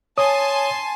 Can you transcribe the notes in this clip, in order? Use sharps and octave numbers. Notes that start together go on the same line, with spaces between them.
C#5 G#5 A5 C6 D#6